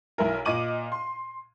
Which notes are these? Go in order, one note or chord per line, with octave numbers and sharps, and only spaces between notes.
B1 E4 A#4
A#2 D#5 D6 D#7 F#7
C6